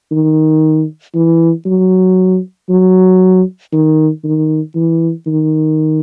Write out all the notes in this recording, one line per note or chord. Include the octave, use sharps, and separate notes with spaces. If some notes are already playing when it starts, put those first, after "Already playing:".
D#3
E3
F#3
F#3
D#3
D#3
E3
D#3